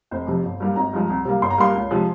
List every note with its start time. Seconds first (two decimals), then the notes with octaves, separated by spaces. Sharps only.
0.11 F1 C5
0.27 F2 C3
0.43 G1
0.60 G2 G3 A#3
0.76 G#1 A#5
0.93 G2 F3 G#3
1.10 C2
1.25 C3 G3 A#3
1.42 G1 C6
1.51 A#5
1.58 G2 G3 A#3 C6
1.76 C#2
1.91 C3 F3 G#3